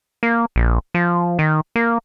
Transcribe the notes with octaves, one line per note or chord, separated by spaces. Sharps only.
A#3
A#1
F3
D#3
A#3